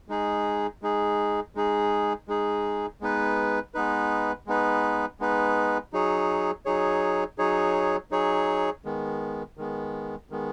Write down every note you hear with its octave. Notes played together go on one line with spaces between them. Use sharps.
G#3 D#4 G#4
G#3 D#4 G#4
G#3 D#4 G#4
G#3 D#4 G#4
G#3 B3 D#4 B4
G#3 B3 D#4 B4
G#3 B3 D#4 B4
G#3 B3 D#4 B4
F#3 D#4 G#4 C#5
F#3 D#4 G#4 C#5
F#3 D#4 G#4 C#5
F#3 D#4 G#4 C#5
D#3 G#3 B3
D#3 G#3 B3
D#3 G#3 B3